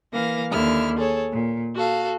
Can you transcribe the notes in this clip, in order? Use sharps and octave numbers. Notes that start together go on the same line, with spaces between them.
E3 A#3 F5 A#6
D#2 D3 E4 F6
G#4 A4 C#5
A#2
F#4 A4 F5